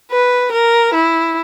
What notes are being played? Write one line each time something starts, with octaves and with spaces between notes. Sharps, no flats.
B4
A#4
E4